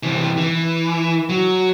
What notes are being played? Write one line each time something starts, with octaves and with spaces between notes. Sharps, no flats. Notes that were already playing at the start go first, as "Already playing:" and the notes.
C3 E3
E3
F#3